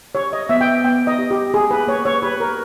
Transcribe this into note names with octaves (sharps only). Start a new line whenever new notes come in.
G4 C#5
D#5
B3 E5
G5
E5
B3 G5
D#5
G4
G4
A#3 G#4
B4
A#3 C#5
C#5
G4 B4
A#4